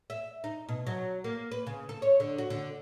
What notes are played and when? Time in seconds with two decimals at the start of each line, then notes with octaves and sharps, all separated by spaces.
0.10 E5
0.44 D#4
0.69 B2
0.87 F#3
1.24 A#3
1.51 B4
1.67 C#3
1.89 A4
2.02 C#5
2.20 D3
2.38 F#4
2.50 D3